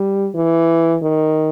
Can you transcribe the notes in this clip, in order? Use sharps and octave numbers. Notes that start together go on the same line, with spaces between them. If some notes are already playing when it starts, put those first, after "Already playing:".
Already playing: G3
E3
D#3